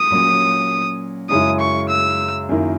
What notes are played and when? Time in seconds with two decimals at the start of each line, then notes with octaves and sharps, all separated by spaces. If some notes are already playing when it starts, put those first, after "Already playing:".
Already playing: D#6
0.10 A#2 F#3 C#4
1.30 F#2 C#3 G#3 C#4 E4 D#6
1.60 C#6
1.90 E6
2.49 F#2 D#3 A#3 E4